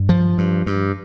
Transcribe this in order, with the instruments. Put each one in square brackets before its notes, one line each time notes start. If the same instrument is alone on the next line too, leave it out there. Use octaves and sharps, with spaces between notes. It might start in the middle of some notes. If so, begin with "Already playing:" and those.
Already playing: [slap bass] G2
F3
G2
G2